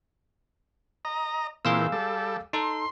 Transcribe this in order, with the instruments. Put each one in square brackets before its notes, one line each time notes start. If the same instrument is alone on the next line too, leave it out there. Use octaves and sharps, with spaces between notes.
[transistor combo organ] D#5 A#5
[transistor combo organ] A#2 E3 C4 [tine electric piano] G#4 F5 E6
[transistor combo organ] G3 A4
[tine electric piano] D#4 A4 [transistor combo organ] C6